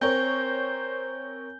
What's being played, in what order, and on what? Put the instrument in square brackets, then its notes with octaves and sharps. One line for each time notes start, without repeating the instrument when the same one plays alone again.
[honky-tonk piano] C4 A#4 C#5 [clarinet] C5 [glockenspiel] G#5 G6 G7